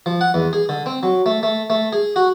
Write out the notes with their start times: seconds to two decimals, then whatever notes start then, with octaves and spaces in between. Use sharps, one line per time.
0.06 F3
0.21 F#5
0.34 E2
0.53 G#4
0.69 D3
0.86 C4
1.03 F#3
1.26 A3
1.43 A3
1.70 A3
1.93 G#4
2.16 F#4